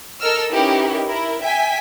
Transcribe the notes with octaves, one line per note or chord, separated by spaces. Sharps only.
A4 A#4 D#5 E6 F6
C#4 D#4 E4 G4 A#4 B4
E4 A#4
E5 G5 G#5 B6